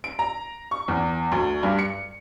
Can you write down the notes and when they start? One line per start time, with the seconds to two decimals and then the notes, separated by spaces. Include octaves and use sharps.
0.04 D7
0.19 A#5
0.71 C#6
0.88 E2
1.32 D2
1.63 G2
1.79 C#7